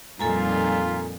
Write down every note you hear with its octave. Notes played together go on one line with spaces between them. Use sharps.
F2 A#2 G3 D#4 F4 A4 G#5 A#5